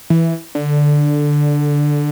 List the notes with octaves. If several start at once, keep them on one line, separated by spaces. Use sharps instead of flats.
E3
D3